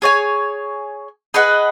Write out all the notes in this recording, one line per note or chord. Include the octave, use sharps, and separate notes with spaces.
G#4 C#5 G#5
G#4 B4 D#5 F#5